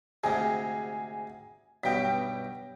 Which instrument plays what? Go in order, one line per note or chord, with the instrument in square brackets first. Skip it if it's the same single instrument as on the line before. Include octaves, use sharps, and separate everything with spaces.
[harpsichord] D2 G#2 C3 [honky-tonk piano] G#4
[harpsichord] B1 G2 B2 [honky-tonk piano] G5 B6